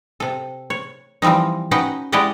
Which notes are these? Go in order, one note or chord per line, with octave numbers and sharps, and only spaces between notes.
C3 A4
C#5
E3 F3 G3 C4 D#4
C#4 D#4 F#4 B4 F#5 G5
G#3 E4 G4 D5 D#5 F#5